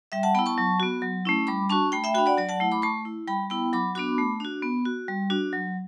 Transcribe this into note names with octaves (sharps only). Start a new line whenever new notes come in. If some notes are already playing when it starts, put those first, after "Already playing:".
G3 E5 G5
F#5 A5
B3 E4 G5 B5
A5 C#6
F#3
B3 F#4
F#3
A3 C#4 E4
G3 B5 D6
D4 F#4 A5 C#6
A3 G5 B5
E5 G5
D4 F#4 G5 B5
D5 F#5
F#3 D5 F#5
F#5 A5
A3 E4
B5 D6
A3 A5 C#6
E4
G3 G5 B5
B3 E4 G5 B5
F#3 B5 D6
B3 D4 F#4 B5 D6
A3
D4 F#4
B3
F#4
G3
D4 F#4
F#3